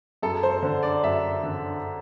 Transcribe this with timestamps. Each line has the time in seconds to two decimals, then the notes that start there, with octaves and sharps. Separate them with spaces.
0.23 F#2 A4
0.43 C5
0.63 D3
0.83 D5
1.04 F#2 E5
1.43 D3